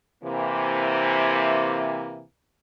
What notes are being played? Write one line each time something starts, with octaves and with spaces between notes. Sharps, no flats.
C3 E3 A#3